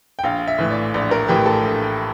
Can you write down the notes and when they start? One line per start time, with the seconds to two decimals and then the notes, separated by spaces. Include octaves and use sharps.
0.19 G5
0.24 A#1 F5
0.48 E5
0.58 A2 E3
0.70 D5
0.94 A#1 D5
1.11 A#4
1.28 A2 E3 G4
1.46 A4
1.64 A#1